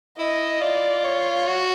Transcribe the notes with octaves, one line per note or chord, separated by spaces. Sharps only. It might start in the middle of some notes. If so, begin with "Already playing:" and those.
E4 D#5
F4 D5
C#5
F#4